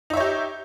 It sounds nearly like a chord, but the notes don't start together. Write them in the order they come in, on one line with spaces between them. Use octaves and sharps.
D#4 E5 C#5 G4